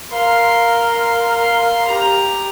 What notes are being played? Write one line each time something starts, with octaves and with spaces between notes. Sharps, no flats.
A#4 F5 C6
G4 A#5